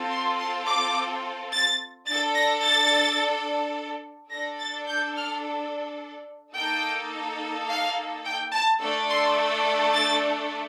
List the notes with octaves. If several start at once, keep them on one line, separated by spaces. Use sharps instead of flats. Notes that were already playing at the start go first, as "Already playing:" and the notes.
Already playing: C4 F4 A4
C6
C6
D6
A6
D4 A4 A6
A#6
A6
D4 A4 A#6
A6
G6
F6
A#3 D#4 A4 G5
F5
G5
A5
A3 D4 A4
C6
A6